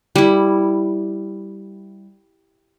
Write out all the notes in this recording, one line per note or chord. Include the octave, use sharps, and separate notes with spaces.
G3 E4